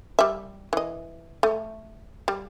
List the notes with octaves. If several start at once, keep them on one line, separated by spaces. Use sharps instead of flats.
G3 E5
E3 D#5
A3
G3